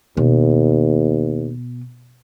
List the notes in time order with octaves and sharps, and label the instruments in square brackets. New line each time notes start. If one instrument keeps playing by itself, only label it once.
[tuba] D#2 [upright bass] B2